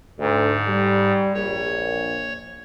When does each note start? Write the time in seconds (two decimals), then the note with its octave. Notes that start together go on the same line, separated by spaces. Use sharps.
0.19 D2 G#2
0.67 G3
1.34 A#1 C#5